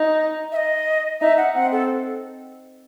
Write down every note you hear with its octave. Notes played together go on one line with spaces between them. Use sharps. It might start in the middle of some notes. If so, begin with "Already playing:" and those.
Already playing: D#4
E5
D#5
D#4 E5
F#5
C4 F#5
A4